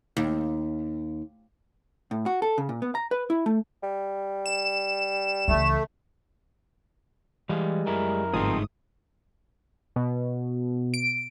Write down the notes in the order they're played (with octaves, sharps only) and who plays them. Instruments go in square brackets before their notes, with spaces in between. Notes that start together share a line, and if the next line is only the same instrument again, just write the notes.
[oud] D#2
[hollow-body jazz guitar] A2
F#4
A4
C#3
A#2
B3
A#5
B4
E4
A3
[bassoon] G3
[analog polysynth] E7
[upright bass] C#2 E3 [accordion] A3
[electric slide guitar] E3 F5 [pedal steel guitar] G3 G#3
[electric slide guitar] F#2 E4 G#5 [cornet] A#4
[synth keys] G1 G#2 D#6 [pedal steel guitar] F3 C4 [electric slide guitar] A3 D#4 G#4
[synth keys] B2
D7